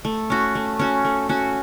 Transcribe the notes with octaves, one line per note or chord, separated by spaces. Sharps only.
A3
C#4 F#4
A3
C#4 F#4
A3
C#4 F#4